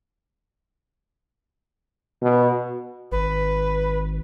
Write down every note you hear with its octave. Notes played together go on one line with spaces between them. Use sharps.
B2
G#1 B4